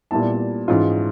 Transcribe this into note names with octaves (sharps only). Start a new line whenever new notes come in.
A#2 G3 B3 E4 A5
G#2 E3 G#3 C#4 F4